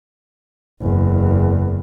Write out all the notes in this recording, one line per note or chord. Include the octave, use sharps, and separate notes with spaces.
F#1 E2